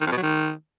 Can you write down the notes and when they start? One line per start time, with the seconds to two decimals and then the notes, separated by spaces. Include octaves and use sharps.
0.01 D#3
0.06 F2
0.12 B2
0.17 F#3
0.22 D#3